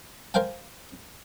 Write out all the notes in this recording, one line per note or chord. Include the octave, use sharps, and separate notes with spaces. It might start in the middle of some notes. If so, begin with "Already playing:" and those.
A#4 C5 F5 G5 G#5